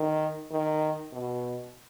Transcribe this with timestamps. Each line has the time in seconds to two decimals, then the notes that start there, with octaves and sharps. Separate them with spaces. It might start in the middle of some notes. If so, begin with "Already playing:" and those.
Already playing: D#3
0.51 D#3
1.13 B2